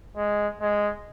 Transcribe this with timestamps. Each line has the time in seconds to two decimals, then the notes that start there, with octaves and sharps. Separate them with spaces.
0.17 G#3
0.61 G#3